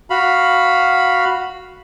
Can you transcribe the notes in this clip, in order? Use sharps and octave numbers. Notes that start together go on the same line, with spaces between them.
F#4 F5 B5